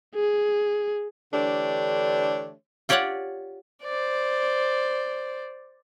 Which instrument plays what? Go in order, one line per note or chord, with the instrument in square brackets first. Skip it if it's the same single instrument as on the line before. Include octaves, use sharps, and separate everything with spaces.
[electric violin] G#4
[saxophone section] D3 E3 A3 D4 G4 C#5
[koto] F4 G4 C#5 D5 F5 F#5
[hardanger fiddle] C5 D5